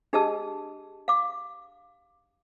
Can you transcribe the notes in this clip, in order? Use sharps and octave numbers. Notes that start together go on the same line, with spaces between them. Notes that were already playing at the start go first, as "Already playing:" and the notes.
D4 G4 G#4 D#5 A5 E6
F5 D6